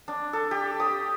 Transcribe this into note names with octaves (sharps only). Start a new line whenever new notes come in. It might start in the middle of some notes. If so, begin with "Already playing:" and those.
D4
A4
G4
D#6